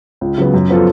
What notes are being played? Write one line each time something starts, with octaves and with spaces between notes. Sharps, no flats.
C#2
C#3 F#3 B3
F#2
F3 B3 F4 A4